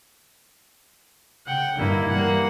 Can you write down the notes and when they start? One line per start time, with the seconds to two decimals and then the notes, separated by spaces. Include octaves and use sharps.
1.46 C#3 F#5 G5
1.78 G2 D3 D#3 A#3 E4
2.10 E3 G3 A#3 F#5